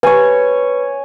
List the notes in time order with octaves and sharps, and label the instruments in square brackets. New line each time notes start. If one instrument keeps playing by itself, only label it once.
[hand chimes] B4 [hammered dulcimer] C#5 G#5